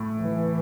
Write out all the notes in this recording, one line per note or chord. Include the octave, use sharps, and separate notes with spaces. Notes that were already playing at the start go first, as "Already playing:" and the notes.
Already playing: A2
E3